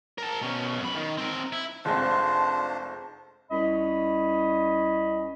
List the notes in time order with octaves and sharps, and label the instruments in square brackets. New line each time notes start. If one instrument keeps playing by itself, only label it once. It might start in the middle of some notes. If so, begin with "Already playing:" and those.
[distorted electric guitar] A#4 A5
B2 C#4
F#2 B5
D#3
C4 A#4
E4
[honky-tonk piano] F1 G#3 C4 [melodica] D4 F4 C5 [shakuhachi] A5
[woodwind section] C2 C#4 D#5 B5